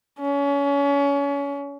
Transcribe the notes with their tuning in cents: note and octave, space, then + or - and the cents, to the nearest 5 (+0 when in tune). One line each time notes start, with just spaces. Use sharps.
C#4 +30